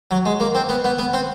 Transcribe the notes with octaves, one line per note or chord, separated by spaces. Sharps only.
F#3
G#3
A#3
C4
B3
B3
B3
C4